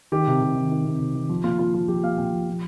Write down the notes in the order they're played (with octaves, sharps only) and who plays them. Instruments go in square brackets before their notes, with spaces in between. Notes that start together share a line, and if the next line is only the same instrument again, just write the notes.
[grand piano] D#3 G4
C3
C3
D#3
D#3
C3
C3
D#3
F3
A#2 F4
A#2 F4
F3 F4
F3 G4
A#2 F5
A#2 G5
F3
F3